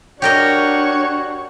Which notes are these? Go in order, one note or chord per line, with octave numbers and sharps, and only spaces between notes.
D4 F#4 G4 A#4 C#5 D#5